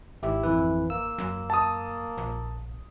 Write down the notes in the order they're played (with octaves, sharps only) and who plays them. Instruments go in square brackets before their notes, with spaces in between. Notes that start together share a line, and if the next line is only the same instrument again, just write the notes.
[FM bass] G#1 [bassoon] E4 [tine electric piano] G4
[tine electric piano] F2 E3 B4
[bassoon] A#3 [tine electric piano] E6
[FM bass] F#2
[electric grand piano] A5 D#6
[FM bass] A#1